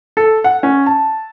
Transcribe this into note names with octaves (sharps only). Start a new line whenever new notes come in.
A4
F#5
C#4
A5